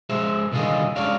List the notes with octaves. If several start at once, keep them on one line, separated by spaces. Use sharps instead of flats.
G#3 G#4 C5 E5
C2 D3 D#3 F4 G#4 D#5
G#3 C#4 D4 C#5 D5 F5